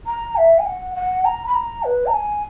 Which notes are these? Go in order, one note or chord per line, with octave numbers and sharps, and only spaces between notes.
A#5
E5
G#5
F#5
F#5
A#5
B5
A#5
B4
A#5
G#5